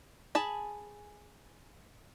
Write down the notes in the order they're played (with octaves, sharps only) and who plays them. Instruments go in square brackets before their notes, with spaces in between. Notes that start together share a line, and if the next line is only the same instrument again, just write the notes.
[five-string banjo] G#4 A5 B5